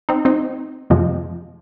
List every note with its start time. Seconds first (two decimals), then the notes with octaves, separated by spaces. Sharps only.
0.09 C4 D#4
0.25 C4 D#4
0.90 F2 C3 F3 G#3